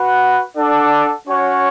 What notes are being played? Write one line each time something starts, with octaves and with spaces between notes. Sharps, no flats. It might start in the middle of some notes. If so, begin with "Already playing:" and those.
Already playing: F#4 B4 F#5
D4 A4 D5 F#5
C#4 F#4 C#5